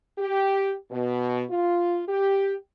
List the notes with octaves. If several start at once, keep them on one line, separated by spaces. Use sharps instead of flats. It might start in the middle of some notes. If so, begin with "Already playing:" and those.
G4
B2
F4
G4